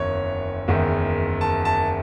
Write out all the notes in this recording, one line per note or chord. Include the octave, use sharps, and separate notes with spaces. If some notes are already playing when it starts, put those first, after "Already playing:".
Already playing: F#1 E2 D#3 C#5
F#1 E2 D#3 G#3
A5
A5